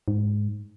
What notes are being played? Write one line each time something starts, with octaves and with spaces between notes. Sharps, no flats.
G#2